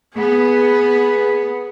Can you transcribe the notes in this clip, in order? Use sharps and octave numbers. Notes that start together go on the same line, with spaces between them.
B3 G#4